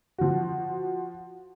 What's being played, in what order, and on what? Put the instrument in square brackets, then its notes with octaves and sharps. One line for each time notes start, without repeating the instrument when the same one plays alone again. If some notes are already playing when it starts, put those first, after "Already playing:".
[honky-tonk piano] F3 F#4